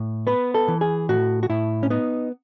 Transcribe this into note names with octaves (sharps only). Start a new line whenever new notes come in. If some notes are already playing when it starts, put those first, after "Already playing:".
Already playing: A2
B3 B4
A4
E3
G#4
A2 F#4
F#4
A2 E4
C#4
B3 D#4